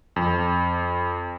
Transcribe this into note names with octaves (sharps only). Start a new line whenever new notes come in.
F2